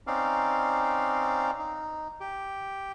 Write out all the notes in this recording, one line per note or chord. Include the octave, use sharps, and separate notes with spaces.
C4 C#4 D#4 D5 F5
D#4
G4